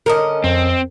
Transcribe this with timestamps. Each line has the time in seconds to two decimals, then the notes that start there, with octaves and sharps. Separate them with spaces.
0.06 D3 C#4 A#4 D#5
0.44 F2 C4